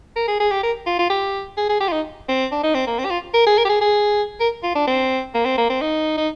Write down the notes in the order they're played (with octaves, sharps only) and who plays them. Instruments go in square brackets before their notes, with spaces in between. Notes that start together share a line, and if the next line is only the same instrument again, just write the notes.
[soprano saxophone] A#4
G#4
G#4
G4
A#4
F4
F4
G4
G#4
G#4
G4
F4
D#4
C4
D4
D#4
C4
A#3
C4
G4
F4
A#4
G#4
A#4
G4
G#4
G#4
A#4
F4
D4
C4
A#3
C4
A#3
C4
D#4
D#4